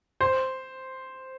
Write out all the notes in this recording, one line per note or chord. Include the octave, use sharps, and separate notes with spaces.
C5